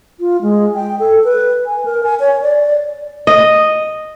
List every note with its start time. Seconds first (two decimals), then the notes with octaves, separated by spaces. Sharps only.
0.20 F4
0.42 G#3
0.75 G5
1.00 A4
1.24 B4
1.66 G#5
1.85 A#4
2.03 G#5
2.20 C#5
2.42 D5
3.27 D#5